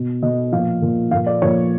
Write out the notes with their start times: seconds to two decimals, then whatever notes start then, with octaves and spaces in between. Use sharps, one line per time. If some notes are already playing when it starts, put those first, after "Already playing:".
Already playing: B2
0.23 B2 D#5
0.52 A#2 F3 F5
0.82 A#2 F3
1.11 A#2 F3 F5
1.27 D5
1.42 A#2 F3 C#5